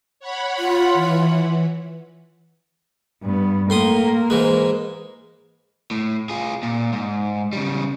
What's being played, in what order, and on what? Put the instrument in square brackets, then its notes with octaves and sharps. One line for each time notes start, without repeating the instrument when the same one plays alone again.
[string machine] C#5 F#5 B5
[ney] F4
[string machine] E3
[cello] G2 B3
[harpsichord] A2 C6 D#6 [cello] A#3 A#4
[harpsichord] G#2 E3 G#3
[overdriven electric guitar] A2
F4 G#4
A#2
G#2
C#3 G3